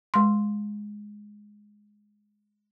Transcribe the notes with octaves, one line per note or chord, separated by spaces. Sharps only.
G#3 C6